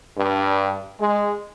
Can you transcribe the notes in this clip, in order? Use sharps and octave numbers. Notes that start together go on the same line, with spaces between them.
G2
G#3